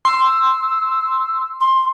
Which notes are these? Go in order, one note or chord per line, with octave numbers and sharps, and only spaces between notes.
C6 E6
C6